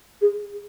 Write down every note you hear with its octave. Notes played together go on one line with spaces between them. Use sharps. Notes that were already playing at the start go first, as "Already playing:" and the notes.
G#4